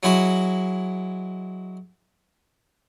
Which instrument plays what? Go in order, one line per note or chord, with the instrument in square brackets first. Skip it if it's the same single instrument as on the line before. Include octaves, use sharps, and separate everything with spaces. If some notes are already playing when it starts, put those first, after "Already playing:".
[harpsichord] F#3 G#3 E4 F#4